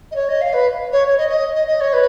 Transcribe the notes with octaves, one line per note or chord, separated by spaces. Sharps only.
D#5
C#5
D#5
F5
B4
C#5
C#5
D#5
D#5
D#5
D#5
C#5
B4